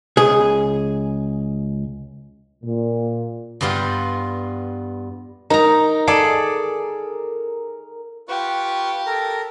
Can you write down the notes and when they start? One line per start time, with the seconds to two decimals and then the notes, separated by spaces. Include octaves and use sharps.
0.17 C#2 G#4
2.63 A#2
3.61 G2 G3 B3 F4 G5
5.50 D#4 A#4 A#5
6.07 G#4 A4 D5
8.29 F4 G4 B4 C#6
9.06 A4 A#4 A#5